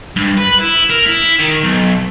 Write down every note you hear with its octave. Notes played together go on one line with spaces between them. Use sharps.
G2
B4
E4
A#4
E4
D#3
B1